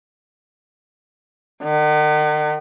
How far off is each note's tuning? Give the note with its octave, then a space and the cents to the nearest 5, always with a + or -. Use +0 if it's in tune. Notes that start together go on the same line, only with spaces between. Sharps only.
D#3 -45